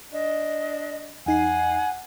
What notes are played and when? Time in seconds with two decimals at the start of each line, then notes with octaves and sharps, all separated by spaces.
0.13 D4 D#5
1.26 E2 D#4 F#5 G#5 C7